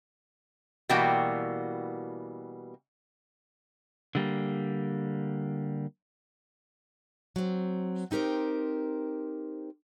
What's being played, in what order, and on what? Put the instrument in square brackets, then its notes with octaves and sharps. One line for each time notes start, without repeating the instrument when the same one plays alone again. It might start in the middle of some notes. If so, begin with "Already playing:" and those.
[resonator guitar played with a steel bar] B2 E3 G3 A#3 F#4 G5
[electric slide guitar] D3 G3 A#3
[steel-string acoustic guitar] F#3 C4
C4 D#4 G4 A#4 C5